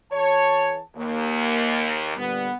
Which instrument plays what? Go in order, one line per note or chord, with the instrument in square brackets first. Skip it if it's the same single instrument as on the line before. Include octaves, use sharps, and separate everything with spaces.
[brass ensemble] E3 G#4 A5 [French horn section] C#5
[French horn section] D#2 [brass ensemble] A#3
[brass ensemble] A#2 D3 G3 [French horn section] B3